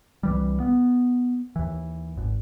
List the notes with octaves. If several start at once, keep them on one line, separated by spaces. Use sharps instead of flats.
C2 E3 G3
B3
D#2 E3
G#1